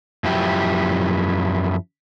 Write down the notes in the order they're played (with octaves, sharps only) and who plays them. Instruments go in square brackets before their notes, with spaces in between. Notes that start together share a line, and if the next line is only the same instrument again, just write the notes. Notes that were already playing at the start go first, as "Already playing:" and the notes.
[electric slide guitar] F#2 F3 E4 G4